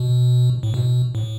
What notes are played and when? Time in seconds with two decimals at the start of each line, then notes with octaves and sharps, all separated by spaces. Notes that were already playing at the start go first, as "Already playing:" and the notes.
Already playing: B2
0.63 A2
0.74 B2
1.15 A2